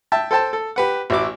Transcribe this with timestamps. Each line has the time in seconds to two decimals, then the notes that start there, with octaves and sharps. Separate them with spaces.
0.12 E5 G5 A5
0.31 A4 C5 G5 A5
0.53 A4
0.76 G4 B4 F#5
1.10 A1 E4 F#4 D6